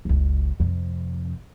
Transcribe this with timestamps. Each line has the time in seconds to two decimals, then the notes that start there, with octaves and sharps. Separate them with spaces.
0.05 F#1 C#2
0.60 F2 C3